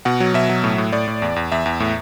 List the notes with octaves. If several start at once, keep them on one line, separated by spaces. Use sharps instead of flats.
B2 F#5
F#3
B2 E5
F#3
A2
A2
A2 D5
A2
E2
E2
E2 E5
E2
A2